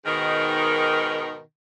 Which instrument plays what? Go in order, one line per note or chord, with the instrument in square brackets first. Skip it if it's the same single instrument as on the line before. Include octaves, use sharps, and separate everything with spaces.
[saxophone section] G#2 B2 D#3